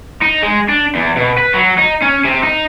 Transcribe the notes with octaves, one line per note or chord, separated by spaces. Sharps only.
D#4
G#3
D4
E2
B2
B4
F#3
D#4
C#4
C3
D#4